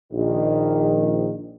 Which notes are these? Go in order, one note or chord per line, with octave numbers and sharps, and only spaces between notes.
A#1 D#3